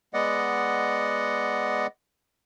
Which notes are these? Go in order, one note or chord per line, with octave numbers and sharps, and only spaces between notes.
G#3 B3 D5 D#5 F#5